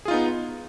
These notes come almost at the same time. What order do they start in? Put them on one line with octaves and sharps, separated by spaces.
G#4 F4 D#4 B3